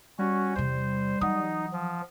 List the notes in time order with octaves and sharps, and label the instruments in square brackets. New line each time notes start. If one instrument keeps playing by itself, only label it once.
[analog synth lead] G3 [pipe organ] C#4 F#4
[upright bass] E2 C3 [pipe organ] C5
[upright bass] E3 F#3 [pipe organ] D#4 [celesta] F#5 D#6
[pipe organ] F3